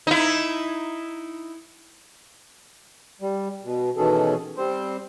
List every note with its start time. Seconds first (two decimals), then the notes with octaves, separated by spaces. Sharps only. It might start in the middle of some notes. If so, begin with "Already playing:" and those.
0.07 D#4 E4
3.21 G3
3.63 B2
3.97 B2 D#3 E3 C#4 G#4 A4
4.57 G3 C4 C5